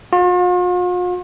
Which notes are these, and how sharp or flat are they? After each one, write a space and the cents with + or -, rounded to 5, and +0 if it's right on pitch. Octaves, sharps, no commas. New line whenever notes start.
F4 +45